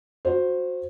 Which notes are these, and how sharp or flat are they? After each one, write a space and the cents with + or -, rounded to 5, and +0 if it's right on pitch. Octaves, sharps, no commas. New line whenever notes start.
F#4 -20 C5 +0